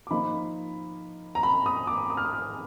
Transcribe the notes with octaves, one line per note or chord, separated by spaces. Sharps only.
D6
F3 A#3 D#4 B5
A#5
B5
D#6
D6
D#6
F6
D#6
F6